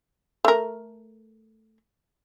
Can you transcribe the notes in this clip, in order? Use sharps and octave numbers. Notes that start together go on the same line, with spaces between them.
A3 A#4